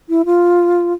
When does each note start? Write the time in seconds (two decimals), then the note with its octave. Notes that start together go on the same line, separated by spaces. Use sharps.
0.09 E4
0.25 F4